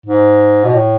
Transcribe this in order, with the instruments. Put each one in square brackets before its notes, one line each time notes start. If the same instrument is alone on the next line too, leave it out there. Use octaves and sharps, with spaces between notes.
[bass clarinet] G#2
B2
A2